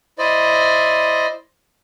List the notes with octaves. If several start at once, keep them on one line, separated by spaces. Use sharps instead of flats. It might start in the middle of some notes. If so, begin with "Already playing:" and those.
E4 C5 D5 D#5